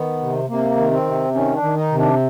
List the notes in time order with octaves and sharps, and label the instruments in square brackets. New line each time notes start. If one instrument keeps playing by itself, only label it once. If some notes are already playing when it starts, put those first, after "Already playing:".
Already playing: [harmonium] D#3 B3
C3
C3 A#3
D#3
C4
C3
D#3 C#4
D4
D#3
D#4
C3
D4